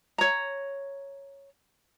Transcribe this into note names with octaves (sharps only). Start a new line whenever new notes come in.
C#5 A#5